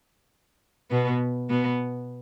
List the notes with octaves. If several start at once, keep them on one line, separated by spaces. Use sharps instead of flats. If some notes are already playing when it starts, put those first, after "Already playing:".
B2 B3
B2 B3